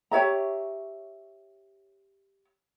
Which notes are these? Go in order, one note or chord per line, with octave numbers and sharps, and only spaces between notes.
G4 C#5 E5 A#5